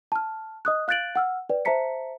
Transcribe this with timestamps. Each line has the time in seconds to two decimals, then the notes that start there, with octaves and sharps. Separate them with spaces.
0.12 A5 F6
0.65 D#5 D#6 F#6
0.88 F5 F#6 G6 A6 D7 F#7
1.16 F#5 E6 F6
1.49 B4 D5 G5
1.65 C5 E5 A5 A#5 B6 C#7